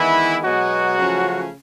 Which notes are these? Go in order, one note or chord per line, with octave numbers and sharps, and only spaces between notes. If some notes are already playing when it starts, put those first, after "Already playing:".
Already playing: D#3 E3 G#3 B3 E4
B2 F#3 G#3 B3 F#4
C#3 F3 A3 C#4